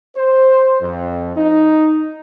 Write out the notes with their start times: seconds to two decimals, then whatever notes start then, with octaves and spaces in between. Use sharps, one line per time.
0.16 C5
0.81 F2
1.36 D#4